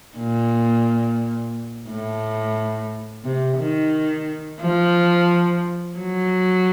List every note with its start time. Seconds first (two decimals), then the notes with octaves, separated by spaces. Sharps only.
0.17 A#2
1.88 A2
3.24 C3
3.58 D#3
4.61 F3
5.98 F#3